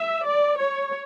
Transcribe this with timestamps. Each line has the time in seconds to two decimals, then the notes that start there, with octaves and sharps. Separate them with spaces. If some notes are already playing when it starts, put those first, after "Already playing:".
Already playing: E5
0.24 D5
0.59 C#5